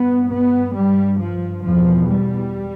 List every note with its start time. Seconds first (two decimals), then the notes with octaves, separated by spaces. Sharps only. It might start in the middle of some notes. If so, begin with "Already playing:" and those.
Already playing: G2 B3
0.31 B3
0.75 G2 G3
1.20 F3
1.65 E2 B2 F3
2.10 G3